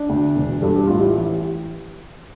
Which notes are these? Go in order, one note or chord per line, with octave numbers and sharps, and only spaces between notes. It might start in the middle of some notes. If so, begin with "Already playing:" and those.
Already playing: D4
D2
E1
G2 A4
G4
A1 F4
E4 G4
E3